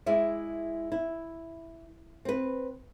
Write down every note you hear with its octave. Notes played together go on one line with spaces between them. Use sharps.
G#3 E4 D5 E5
E4
C4 B4